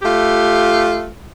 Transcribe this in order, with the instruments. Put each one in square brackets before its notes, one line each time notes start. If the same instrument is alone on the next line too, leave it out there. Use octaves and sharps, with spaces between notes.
[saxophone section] A3 F4 G4